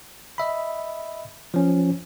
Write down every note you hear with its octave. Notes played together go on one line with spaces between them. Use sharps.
D#5 E5 B5
F3 C#4